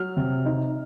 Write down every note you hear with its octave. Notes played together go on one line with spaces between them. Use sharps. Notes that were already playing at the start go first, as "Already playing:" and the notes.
Already playing: F#3 F6
C3
D#4